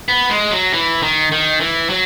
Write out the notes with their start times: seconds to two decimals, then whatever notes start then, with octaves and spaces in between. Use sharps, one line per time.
0.08 B3
0.30 G#3
0.51 F#3
0.73 E3
1.02 D#3
1.32 D#3
1.60 E3
1.90 F#3